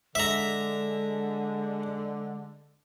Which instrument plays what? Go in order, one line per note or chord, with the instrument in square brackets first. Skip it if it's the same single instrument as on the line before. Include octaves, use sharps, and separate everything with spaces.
[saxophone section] D3 [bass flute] G#3 [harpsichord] E5 A#5